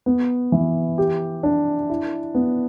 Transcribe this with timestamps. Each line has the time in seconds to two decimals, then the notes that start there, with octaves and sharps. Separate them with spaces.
0.06 B3
0.52 E3
0.98 G4
1.43 D4
1.89 E4
2.35 B3